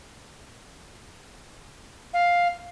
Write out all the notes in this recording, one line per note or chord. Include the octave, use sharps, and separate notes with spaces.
F5